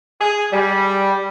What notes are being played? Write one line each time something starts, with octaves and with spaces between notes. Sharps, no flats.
G#4
G3